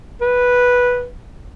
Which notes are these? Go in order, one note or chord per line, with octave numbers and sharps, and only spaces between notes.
B4